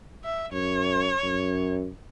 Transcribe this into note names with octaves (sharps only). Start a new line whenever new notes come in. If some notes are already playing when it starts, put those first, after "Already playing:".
E5
F#2 C#5
F#2